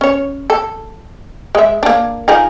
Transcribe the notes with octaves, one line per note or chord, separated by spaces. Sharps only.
C#4 C#5
A4
G#3 E5
A#3 D4
F3 D#4 G#4